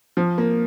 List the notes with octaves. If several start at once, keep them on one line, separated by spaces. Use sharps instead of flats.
F3
A#3